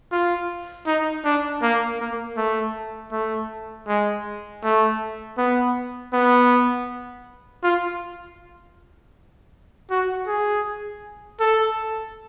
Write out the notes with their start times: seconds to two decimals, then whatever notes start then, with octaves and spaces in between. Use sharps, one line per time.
0.12 F4
0.87 D#4
1.24 D4
1.62 A#3
2.00 A#3
2.37 A3
3.12 A3
3.88 G#3
4.64 A3
5.38 B3
6.13 B3
7.63 F4
9.90 F#4
10.27 G#4
11.40 A4